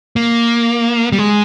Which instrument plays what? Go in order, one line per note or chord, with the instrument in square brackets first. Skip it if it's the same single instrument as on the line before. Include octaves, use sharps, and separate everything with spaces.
[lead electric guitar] A#3
G3
G#3